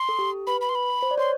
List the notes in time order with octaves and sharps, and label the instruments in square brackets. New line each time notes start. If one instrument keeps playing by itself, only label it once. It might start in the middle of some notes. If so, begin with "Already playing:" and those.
Already playing: [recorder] C6
[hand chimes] A4
G4
[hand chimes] B4 [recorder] B5
[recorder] B5
C6
B5
[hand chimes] C5
D5
[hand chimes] C#5 [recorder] C6